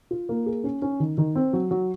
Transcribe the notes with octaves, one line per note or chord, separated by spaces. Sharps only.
F4
A#3
G#4
C#4
C#4
D#3
D#3
C4
F#3
F#3